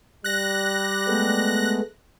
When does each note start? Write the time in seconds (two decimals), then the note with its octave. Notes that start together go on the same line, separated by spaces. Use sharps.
0.24 G3 F#6 A#6
1.07 G#3 A3 B3